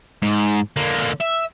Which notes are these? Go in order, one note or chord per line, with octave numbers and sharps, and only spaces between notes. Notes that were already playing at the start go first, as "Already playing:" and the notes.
G#2
D3 A#3
E5